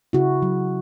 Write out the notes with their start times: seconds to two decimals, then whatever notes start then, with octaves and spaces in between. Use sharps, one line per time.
0.13 C#3 E4 F#4
0.42 F#3